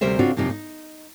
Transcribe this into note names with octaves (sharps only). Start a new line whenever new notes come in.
D2 C3 G3 A#4 C5 E5
C#3 C4 D4 F4 F#4
F#2 C3 F3 A#3 D#4
D#4